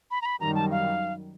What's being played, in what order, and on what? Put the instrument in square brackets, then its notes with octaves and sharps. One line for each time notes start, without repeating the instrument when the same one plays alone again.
[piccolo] B5
A#5
B5
[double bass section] F#2 D#3 G3 [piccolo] A#5
[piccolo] A5
F5